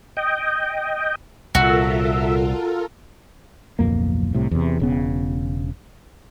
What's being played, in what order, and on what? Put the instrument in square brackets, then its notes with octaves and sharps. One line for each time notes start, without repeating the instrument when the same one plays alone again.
[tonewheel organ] D#5 G5
[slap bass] C2 A#2 [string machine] F4 A4 A#4 [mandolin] F#4 [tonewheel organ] E5
[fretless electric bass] D1 B1 F2 A#3
C2 A2 C3
E2 C3
E1 C#3 B3